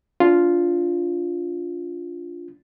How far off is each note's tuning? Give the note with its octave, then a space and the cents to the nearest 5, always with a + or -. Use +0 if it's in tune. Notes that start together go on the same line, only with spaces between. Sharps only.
D4 -25 F4 +0